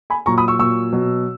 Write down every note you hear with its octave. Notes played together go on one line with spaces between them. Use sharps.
G#5 B5
A#2 F#3 A#5 C#6
B5 D#6
C#6 E6
A#2 F#3 C#6 E6
B2 F#3